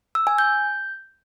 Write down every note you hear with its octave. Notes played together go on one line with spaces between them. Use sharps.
E6
G#5
G6